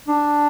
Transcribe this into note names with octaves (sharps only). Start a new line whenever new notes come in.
D4